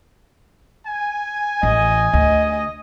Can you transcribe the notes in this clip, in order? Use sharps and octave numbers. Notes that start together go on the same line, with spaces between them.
G#5
A1 D#5
D2 D#5